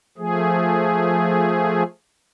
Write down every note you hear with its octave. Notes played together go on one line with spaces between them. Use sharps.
F3 A3 G#4